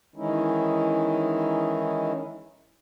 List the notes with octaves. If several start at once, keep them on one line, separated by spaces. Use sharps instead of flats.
D#3 E3 G#3 C#4 D#4 E4